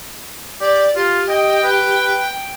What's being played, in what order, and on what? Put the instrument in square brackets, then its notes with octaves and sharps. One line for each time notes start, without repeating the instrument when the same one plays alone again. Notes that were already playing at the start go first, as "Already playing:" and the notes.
[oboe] G4 [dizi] D5
[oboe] F4 [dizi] G4
[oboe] D#5 [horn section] G5
[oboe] B4